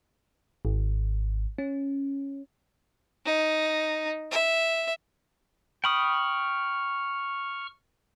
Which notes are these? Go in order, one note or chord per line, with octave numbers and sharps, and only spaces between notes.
G#1
C#4
D#4
E5
G5 B5 C#6 D#6 F6